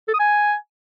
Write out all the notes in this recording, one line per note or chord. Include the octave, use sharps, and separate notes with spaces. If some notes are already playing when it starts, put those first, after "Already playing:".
A4
D#6
G#5